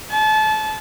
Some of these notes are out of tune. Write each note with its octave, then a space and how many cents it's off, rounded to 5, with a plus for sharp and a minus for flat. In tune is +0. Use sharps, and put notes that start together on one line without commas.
A5 -30